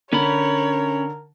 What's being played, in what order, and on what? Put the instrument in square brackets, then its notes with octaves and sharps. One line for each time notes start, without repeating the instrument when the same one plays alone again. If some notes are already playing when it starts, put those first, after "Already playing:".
[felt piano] D3 [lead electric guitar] C#4 B5 [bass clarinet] A#4 [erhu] C#5